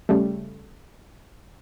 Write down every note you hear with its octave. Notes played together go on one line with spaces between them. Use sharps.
C#3 G3 A3